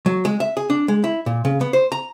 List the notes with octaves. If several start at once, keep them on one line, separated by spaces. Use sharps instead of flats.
F#3
G#3
E5
G#4
D4
G#3
E4
A#2
C#3
B3
C5
A#5